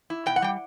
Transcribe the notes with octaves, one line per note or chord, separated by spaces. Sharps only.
E4
B2 G5
F#5
G3 G5